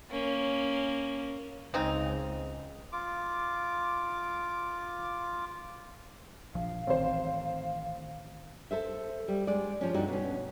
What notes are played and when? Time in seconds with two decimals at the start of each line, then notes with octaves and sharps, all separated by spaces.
0.10 A#3 C#4
1.74 C#2 C#3 C4 D#4
2.92 F4 D6
6.55 A#1 F3 F5
6.87 A1 D#3 C4 C5
8.71 A4 C5 E5
9.28 G3
9.47 G#3 D5
9.81 F3 C#4
9.94 G2 D4 D#4 F#4 A4
10.08 B2 C#4